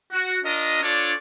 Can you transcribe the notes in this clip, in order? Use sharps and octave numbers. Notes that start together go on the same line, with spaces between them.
F#4
D4 F4 A#4 D#5
D4 F4 A4 C#5 D5